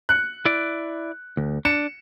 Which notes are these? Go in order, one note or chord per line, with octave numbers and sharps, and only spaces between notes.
F#6 C#7
E4 D5
D2
D4 C#7 E7